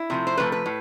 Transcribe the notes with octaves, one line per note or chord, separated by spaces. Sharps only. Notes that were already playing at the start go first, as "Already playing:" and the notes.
Already playing: E4
C3 F3 A3
C5
C3 F3 A3 B4
B4
A2